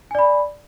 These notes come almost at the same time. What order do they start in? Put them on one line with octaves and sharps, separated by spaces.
G#5 D5 B5